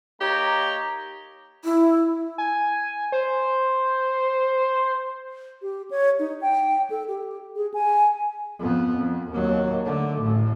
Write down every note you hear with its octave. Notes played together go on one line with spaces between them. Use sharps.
A#3 D#4 G4 C#5 A#5
E4
G#5
C5
G4
C#5
D#4
G5
A4
G4
G#4
G#5
F2 B3
F2
D#2 F#3
D3 A3
A1 A2